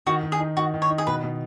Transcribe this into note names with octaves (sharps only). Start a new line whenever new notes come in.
D#3 F#4
D#3
G#4
D#4
D#3 F#4
D#3
C#5
D#4
G#4
B2 B4
B2